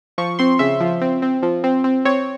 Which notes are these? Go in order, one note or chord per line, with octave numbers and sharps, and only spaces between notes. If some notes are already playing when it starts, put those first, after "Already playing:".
F3 C#6
C4 C6
C#3 E5
F3
C4
C4
F3
C4
C4
C4 C#5